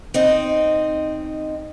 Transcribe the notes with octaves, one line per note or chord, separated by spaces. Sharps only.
C4 D#4 D#5